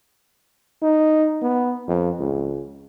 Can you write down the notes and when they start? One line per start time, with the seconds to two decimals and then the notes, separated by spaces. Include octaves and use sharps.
0.82 D#4
1.42 B3
1.88 F2
2.19 C#2